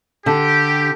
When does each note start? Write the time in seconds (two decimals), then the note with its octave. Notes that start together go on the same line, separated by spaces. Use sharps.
0.26 D3 G4